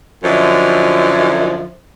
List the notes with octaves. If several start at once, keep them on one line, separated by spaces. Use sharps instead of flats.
F#2 D3 F3 E4 D#5